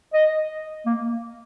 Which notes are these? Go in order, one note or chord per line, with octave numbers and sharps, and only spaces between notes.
D#5
A#3